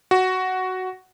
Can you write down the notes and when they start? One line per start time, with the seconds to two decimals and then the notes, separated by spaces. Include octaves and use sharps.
0.11 F#4